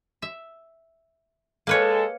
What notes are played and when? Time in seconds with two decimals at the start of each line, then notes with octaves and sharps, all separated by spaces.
0.22 E5
1.67 G#3 A#3 A4 B4 C#5